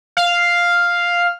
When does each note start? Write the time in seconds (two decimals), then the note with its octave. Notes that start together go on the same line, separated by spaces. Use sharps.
0.17 F5